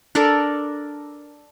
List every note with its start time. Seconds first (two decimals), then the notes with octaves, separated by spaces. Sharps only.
0.15 D4 A4 A#4 D5